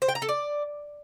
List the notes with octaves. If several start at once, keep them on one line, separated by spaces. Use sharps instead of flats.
C5
G5
A#5
A4
D5